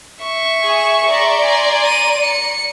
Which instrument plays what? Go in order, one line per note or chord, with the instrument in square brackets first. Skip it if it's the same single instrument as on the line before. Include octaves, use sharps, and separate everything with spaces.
[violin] E5 C#6
[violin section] G#4
D5 A#5 C6
[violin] G#5
D#7
C#7